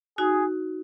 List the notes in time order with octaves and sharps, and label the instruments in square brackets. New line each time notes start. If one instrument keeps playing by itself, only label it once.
[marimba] D#4 F#4 [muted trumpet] G#4